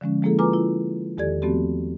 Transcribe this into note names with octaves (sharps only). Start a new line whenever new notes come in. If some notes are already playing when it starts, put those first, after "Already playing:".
D3 F3 G#3 C#4
F3 G#3 A#3 E4 G#4 A4
F4 B4 G#5 A#5 D6
E4 F4
E2 D#3 G4 A4 D5 G#6
F3 A3 B3 C4 F#4 G4